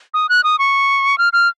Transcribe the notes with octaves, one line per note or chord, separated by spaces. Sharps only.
D#6
F#6
D#6
C#6
F6
F6